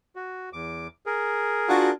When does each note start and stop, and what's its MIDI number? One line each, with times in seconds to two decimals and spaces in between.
0.16 0.49 66
0.53 0.87 40
0.53 0.87 86
1.06 1.91 68
1.06 1.91 70
1.68 1.89 62
1.68 1.89 65
1.68 1.89 66